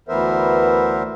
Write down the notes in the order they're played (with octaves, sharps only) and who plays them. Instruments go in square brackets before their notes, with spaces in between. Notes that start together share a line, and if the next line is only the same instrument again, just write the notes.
[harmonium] D2 E3 B3 A#4 C5 E5